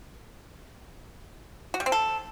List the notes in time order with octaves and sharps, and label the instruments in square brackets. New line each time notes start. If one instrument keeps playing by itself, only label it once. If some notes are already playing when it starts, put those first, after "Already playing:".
[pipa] F#4
G3
C4
A4